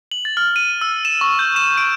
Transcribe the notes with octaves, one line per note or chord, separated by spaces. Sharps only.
F#7
A6
F6
D#7
E6
E7
C#6
G6
E7
D7